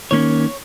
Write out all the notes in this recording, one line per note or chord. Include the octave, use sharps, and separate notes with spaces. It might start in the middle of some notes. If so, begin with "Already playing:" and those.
D#3 A#3 C#4 C#5